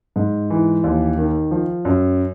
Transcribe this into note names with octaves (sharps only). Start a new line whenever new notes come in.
G#2
E3
D#2
D#3
F3
F#2